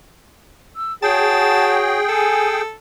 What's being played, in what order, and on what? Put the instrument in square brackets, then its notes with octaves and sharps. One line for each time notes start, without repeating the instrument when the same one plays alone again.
[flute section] E6
[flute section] F#4 C#5 [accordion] G#4 G5 [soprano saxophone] A5
[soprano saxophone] A4 [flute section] G#5